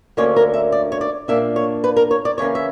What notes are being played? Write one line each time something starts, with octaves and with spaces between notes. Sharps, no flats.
D2 D3 A#3 C#4 C#5
A#4
E5
D5
C#5
D5
A#2 A#3 D4 E5
C#5
B4
A#4
C#5
D5
C#3 E3 A#3 C#4 C#5
E5